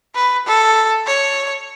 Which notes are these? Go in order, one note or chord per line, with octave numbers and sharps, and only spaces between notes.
B4
A4
C#5